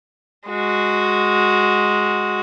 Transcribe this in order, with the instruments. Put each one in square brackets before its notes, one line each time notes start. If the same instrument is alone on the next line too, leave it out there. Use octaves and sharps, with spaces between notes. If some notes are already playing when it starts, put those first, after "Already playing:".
[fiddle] G#3 F#4